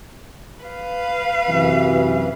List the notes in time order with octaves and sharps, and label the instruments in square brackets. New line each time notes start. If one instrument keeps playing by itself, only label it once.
[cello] B4 F5
[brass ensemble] F#2 C3 E3